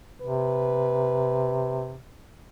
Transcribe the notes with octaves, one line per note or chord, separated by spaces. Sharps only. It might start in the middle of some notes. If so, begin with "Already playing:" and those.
C3 B4